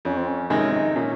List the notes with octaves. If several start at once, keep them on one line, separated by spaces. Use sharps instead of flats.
F2 C#4
C4
C#4
C3 D#3 G#3 C#4
D#4
A#2 C#4